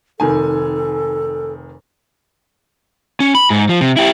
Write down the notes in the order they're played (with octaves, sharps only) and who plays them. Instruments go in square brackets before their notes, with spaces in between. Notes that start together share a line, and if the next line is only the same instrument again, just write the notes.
[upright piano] F1 D#3 G#5 [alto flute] A4
[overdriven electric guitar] C#4
B5
G#2
F3
C3
E4 G4